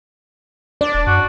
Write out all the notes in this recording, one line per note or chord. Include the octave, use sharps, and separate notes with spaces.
D4 D5
D#1
F#2 F#4